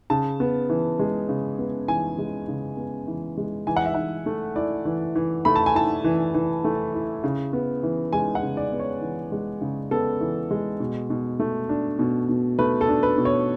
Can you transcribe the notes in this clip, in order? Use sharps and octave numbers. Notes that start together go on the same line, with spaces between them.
C#3 A5
B3
E3
G#3
C#3
B3
E3 G#5
G#3
C#3
B3
E3
G#3
E3 G#5
F#5
E5
E3 F#5
A3
E4 D5
E3
E3
A3 B5
A5
G#5
E4 A5
E3
E3
A3
E4
C#3
B3
E3
G#3 G#5
F#5
C#3
D5
B3
C#5
E3
G#3
C#3
B3 A4
E3
G#3
B2
B2
A3
D4
B2
B2
A3 B4
A4
D4
B4
B2
C#5